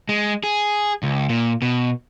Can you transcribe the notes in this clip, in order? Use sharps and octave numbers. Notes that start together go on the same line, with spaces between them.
G#3
G#4
C#2
A#2
B2